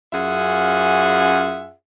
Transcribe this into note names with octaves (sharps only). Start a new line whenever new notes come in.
F#2 C#4 F4 G#4 E5 F#5